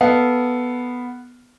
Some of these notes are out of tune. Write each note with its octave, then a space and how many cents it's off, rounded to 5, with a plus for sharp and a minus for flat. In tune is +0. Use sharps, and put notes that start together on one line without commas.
B3 +0 A4 +0 F5 +0